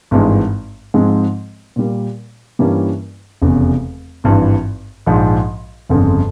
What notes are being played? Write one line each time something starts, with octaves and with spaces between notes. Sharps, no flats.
G#1 G2 E3 G#3
G#2 F3 G#3 C4
A#2 G3 A#3
G2 E3 G3 A#3 C#4
F1 E2 C#3
G#1 G2 E3
A#1 G#2 F3
G1 F2 C#3